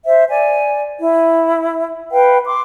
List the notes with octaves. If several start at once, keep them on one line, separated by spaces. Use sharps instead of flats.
C5 E5
D5 G#5
E4
B4 F5 G5
C6 D6